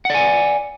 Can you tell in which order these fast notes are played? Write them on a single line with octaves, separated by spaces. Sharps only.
F#5 D5 G#5